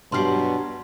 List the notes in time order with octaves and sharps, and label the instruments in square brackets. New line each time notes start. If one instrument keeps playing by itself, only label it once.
[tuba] G2 [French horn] B2 [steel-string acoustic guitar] F#3 G3 [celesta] C6 F6 C7